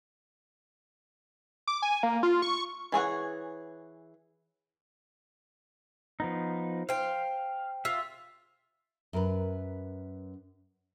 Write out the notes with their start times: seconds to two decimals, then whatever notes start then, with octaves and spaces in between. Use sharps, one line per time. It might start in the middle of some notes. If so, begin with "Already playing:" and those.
1.67 D6
1.82 G#5
2.03 A#3
2.23 F4
2.42 C#6
2.92 E3 G#4 C#5 F#5
6.20 F3 B3 D#4
6.89 C5 F5 G5
7.85 F4 E5
9.13 F#2 A#4 B4